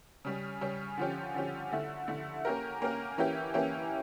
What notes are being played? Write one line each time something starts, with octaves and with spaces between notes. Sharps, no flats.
C#3 G3 C#4
C#3 G3 C#4
D3 F3 C#4 G4
D3 F3 C#4 G4
D3 A3 E4
D3 A3 E4
A#3 C#4 G4 A#4
A#3 C#4 G4 A#4
E3 A#3 C#4 E4 G4
E3 A#3 C#4 E4 G4